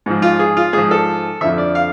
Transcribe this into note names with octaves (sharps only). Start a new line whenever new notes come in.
G#2 F3
F4
G#4
F4
G#2 F3 G#4
A4
F2 D3 F3 E5
D5
F5